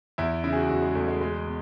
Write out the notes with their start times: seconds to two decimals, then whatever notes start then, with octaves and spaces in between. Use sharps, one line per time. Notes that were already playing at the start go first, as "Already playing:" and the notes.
0.18 E2 E4
0.44 C#3 E4
0.53 G#4
0.56 F#4
0.69 E2 F#4
0.83 G#3
0.95 E2 A3
1.08 G#3
1.20 B2 G#3
1.46 B2